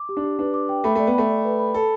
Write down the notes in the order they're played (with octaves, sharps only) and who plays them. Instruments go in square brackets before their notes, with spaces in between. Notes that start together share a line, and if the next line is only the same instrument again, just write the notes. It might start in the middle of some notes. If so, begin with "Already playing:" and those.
Already playing: [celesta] D6
G4
[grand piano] D4
[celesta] G4
[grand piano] D4 [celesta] B4
[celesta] D6
G5
[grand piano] A3 [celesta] B5
[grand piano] A3 [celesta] D5
[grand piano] B3
[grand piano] A3 [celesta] B5
[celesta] D5
B4
B5
[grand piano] A4 [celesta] B5